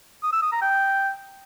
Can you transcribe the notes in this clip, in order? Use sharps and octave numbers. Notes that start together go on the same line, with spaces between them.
D#6
E6
D#6
A#5
G5